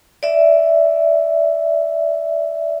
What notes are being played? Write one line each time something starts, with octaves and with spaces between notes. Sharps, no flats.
D5 E5